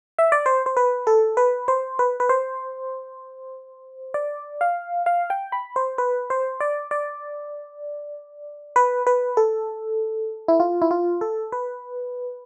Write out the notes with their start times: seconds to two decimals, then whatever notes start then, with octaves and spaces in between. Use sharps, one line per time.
0.19 E5
0.32 D5
0.46 C5
0.66 C5
0.77 B4
1.07 A4
1.37 B4
1.68 C5
1.99 B4
2.20 B4
2.29 C5
4.14 D5
4.61 F5
5.06 F5
5.30 G5
5.52 B5
5.76 C5
5.98 B4
6.30 C5
6.60 D5
6.91 D5
8.76 B4
9.07 B4
9.37 A4
10.48 E4
10.60 F4
10.82 E4
10.91 F4
11.21 A4
11.52 B4